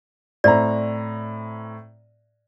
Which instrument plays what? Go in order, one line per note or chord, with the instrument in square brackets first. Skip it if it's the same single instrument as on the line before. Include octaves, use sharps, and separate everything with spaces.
[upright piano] A2 C4 A#5 [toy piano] D5